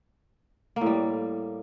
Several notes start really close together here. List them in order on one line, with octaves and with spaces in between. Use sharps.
A#3 A2 G3